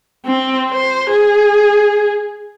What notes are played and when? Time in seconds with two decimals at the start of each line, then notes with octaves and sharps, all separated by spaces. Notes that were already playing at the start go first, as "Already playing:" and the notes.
0.26 C4
0.69 C5
1.10 G#4